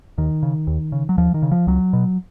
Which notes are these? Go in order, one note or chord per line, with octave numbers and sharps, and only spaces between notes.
D#2 D#3
C#3
D#2
C#3
F#3
D#2 F3
D#3
C#3
F3
C#2 F#3
B2